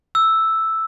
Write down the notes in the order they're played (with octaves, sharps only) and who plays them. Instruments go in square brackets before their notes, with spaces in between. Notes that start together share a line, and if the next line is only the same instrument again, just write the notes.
[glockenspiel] E6